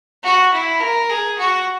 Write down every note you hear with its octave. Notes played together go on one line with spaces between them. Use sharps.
F#4
E4
A#4
G#4
F#4